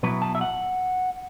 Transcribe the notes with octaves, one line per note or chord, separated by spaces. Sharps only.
B2 F#3 B3 E4 B4
A5
E5
F#5